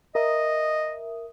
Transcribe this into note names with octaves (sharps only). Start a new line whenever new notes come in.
A#4 D#5 E5 D#6